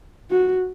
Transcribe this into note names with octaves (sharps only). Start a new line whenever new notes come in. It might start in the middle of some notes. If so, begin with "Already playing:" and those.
F#4